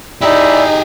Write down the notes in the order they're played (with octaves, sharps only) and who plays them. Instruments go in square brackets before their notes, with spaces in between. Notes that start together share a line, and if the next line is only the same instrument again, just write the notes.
[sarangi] D#4 [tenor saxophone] E4 [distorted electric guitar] G4 G#4 [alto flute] D5